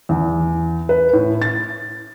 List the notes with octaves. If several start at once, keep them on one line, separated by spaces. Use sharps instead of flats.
E2
B4
A2
A6